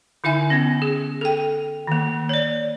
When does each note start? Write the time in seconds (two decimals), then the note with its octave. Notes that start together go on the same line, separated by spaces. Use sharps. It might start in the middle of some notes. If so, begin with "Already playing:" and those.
0.24 D3 D#4 E4 E5 G#5
0.50 B3 C#4
0.82 G#4
1.21 A4 G5
1.87 D#3 A#3
2.29 C#5 D5